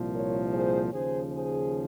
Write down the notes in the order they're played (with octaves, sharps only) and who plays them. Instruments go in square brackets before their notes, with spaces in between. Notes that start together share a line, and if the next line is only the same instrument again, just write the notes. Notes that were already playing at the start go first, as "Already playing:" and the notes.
Already playing: [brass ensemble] C2 A#2 F3
A#4 C#5
G#4 C5
D#2 C#3 F3 G#4 C5
G#4 C5